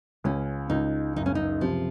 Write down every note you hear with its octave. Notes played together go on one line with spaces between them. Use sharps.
C#2 C#4
C#2 D#4
F#1 D#4
C#4
D#4
C3 F3